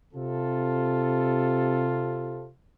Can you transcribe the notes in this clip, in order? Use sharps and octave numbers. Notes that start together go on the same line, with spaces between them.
C3 F4 A4